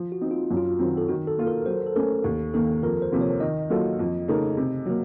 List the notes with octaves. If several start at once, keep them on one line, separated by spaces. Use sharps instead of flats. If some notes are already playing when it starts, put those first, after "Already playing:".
Already playing: F3
F#4
C4 D#4
F4
F#2
F4
D#3 F#3 C4
A4
D#3 F#4
A4
A#3 F4
A#4
F#3 C5
A4
A3 C#4 A#4
D#2 A4
D#3 A#3 A4
F2 A#4
C5
C3 F3 A#3 F4
C#5
D#3 D#5
F#3 A#3 F4 A4
F2
C#3 A3 D#4 A#4
C3
F#3 A#3